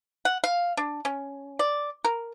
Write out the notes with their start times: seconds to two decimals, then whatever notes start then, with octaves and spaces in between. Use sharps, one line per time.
0.25 F#5
0.44 F5
0.77 D4
1.05 C#4
1.59 D5
2.05 A#4